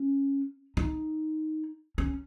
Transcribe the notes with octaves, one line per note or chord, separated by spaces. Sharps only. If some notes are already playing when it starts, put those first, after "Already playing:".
Already playing: C#4
D#4
C#4